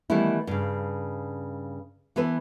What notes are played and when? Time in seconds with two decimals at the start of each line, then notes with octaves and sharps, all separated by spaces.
0.10 D#3 E3 G3 A3 B3 E4
0.47 G2 C#3
2.16 E3 B3 A4 B4